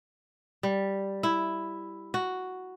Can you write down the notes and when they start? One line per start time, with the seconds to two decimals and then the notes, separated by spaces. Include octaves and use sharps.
0.63 G3
1.23 E4
2.14 F#4